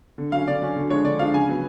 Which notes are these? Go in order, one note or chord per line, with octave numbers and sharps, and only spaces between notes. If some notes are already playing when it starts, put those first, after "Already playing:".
D3
F#3 C#4 F5
D3 D5
F#3 C#4
D3
F3 G#3 D4 C#5
D3 D5
F3 G#3 D4 F5
C#3 G#5
F#3 B3